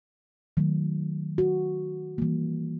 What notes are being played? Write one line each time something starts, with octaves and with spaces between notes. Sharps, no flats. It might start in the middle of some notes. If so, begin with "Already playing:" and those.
D#3 F#3 A3
F#4
E3 G3 A#3